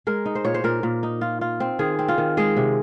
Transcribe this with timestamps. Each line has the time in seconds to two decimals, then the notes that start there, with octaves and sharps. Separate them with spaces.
0.07 G#3 A#4
0.26 D#4
0.35 C5
0.45 A#2 C#5
0.54 C5
0.64 A#2 A#4
0.83 A#2
1.03 D#4
1.21 F4
1.41 F4
1.60 C4
1.79 D#3 G#4
1.99 C4
2.08 F4
2.18 D#3
2.37 G#3 G#4
2.57 C3